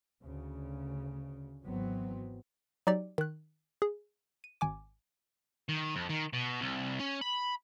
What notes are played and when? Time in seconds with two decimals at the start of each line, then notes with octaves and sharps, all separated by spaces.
0.23 D2 C#3
1.64 G#1 E3 F#3 B3 C4
2.87 F#3 D#4 G4 D5
3.18 D#3 F#6
3.82 G#4
4.44 D#7
4.61 G#1 G#5 D6
5.69 D#3
5.96 F2
6.10 D#3
6.33 B2
6.61 C2
7.00 C#4
7.21 B5